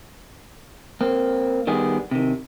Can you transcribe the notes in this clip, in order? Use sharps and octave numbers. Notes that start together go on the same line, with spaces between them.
A#3 C4
D#3 G3 B3 G#4
C3 D#3